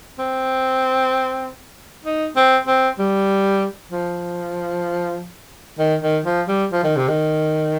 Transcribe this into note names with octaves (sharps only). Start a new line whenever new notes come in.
C4
D#4
C4
C4
G3
F3
D#3
D#3
F3
G3
F3
D#3
C3
D#3